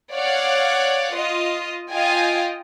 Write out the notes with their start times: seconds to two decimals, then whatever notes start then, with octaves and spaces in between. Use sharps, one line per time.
0.13 C#5 D5 F5 F#5
1.14 F4 D#5
1.92 F4 D#5 G5 G#5